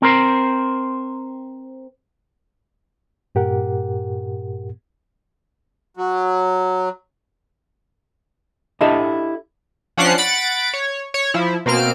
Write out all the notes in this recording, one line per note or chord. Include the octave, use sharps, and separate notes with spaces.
C4 A#4 C5
G2 A#2 G4 A#4 F#5
F#3
D4 E4 G4 A4 D#5 E5
F3 C#4 D4 F#5 F#6 C7
F#5 B5 A6 D7
C#5
C#5
F3 E4
B2 A#3 C4 F6 D7